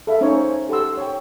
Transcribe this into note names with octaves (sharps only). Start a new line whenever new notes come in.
A4 E5 F5
C#4 D#4 C5 C#5
G4 A4 F#5 C6 E6
C#5 G5